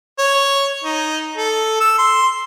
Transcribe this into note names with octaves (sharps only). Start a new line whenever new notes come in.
C#5
D#4
A4
E6
C6